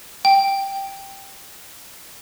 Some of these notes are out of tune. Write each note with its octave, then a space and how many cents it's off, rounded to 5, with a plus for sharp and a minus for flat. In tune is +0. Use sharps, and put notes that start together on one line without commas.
G5 +0